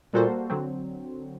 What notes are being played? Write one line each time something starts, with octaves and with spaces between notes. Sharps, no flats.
A#2 G3 A#3 F#4 A4 C5
D3 F#3 C4